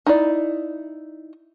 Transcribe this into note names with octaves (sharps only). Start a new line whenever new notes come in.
D#4 E4 D5